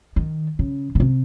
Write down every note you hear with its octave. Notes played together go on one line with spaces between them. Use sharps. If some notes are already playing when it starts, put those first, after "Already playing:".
D#3
C#3
B2
C3